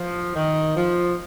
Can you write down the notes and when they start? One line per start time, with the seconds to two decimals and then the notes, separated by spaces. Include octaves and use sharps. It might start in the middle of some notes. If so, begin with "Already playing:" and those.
Already playing: F3
0.35 D#3
0.76 F3